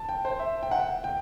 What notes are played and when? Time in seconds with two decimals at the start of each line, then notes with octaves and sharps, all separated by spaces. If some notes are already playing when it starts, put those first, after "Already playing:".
Already playing: A5
0.09 G5
0.25 C5
0.40 E5
0.63 G5
0.71 F#5
1.04 G5